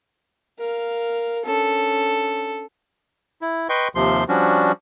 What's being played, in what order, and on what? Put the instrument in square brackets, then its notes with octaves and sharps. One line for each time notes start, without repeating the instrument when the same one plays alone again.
[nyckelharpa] A#4 F5
[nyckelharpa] C#4 D4 [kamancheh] A4
[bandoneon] E4
B4 D#5 G5 C6 C#6
D#2 C3 F3 C6
F3 G3 C#4 D4 F#4